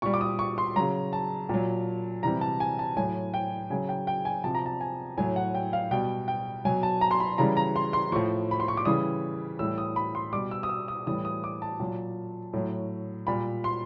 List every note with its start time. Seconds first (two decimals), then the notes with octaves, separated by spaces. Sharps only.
0.02 A#2 G3 C#6
0.14 D6
0.21 D#6
0.39 C#6
0.58 C6
0.76 C#3 F#3 A#5
1.13 A5
1.49 A#2 F#3
2.23 C3 E3 G3 A#5
2.41 A5
2.60 G#5
2.79 A5
2.97 A2 F#3 G#5
3.34 G5
3.70 C#3 F#3 G#5
3.89 G5
4.07 G5
4.25 G#5
4.44 C3 F3 A5
4.55 A#5
4.66 A5
4.81 G#5
5.18 A2 F#3 G#5
5.36 F#5
5.55 G5
5.73 F5
5.91 B2 G3 G5
6.28 G5
6.65 B2 F#3 G#5
6.83 A5
7.01 A#5
7.11 C6
7.20 B5
7.38 C#3 E3 G3 A#5
7.57 A#5
7.76 C6
7.93 C6
8.12 A2 F3 C#6
8.51 B5
8.60 C6
8.68 C#6
8.77 D6
8.85 C#3 E3 G3 D#6
9.59 A2 E3 G3 E6
9.78 D#6
9.96 B5
10.15 C6
10.32 B2 G3 D6
10.51 E6
10.63 D#6
10.69 E6
10.88 D#6
11.06 A2 E3 G3 D#6
11.25 D#6
11.44 D6
11.62 A5
11.80 A#2 F#3
12.53 A2 F#3
13.27 A#2 G3 B5
13.64 C6